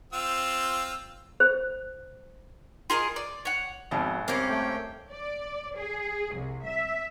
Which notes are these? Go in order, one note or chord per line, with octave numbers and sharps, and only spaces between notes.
C4 F4 E6
C5
F4 G#4 A#4 D#5
D5
C#5 F#5
G#1 F2 B2
G3 A#3 C4 C#4
A3 G5
D5
G#4
C2
E5